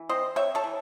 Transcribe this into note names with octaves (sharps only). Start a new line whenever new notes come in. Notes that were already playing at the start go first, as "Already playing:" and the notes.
Already playing: E3
C4 C5 D#5
C4 C#5 E5
A4 C#5
E3